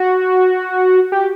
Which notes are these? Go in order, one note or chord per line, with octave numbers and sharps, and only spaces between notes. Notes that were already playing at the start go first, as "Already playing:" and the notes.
Already playing: F#4
G4